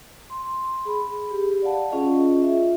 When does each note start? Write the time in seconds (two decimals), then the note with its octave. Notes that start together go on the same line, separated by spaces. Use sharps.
0.30 C6
0.85 G#4 B5
1.31 G4
1.62 D5 F5 F#5 A5
1.91 C#4 F4 G#4 D#5
2.42 F4 E5